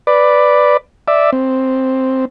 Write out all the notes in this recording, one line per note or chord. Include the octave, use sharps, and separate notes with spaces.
B4 D5
D5 E5
C4